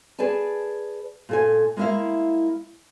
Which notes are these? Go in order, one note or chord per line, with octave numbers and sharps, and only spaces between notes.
G#4 B4 D5 G#5 A5
A#2 A4 G#5
G#3 A#3 B3 E4 E5 F5